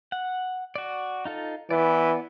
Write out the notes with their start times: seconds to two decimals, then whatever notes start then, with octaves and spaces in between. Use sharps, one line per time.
0.12 F#5
0.76 F#4 D5
1.25 D#4 F4 A4
1.71 E3 B3 D5